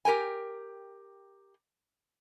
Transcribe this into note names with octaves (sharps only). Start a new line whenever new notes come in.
G4 A#4 G5 G#5